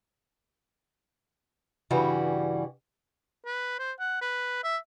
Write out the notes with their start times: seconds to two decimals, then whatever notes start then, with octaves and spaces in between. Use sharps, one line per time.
1.90 G2 C#3 E3 G3 F#4
3.46 B4
3.79 C5
4.00 F#5
4.22 B4
4.64 E5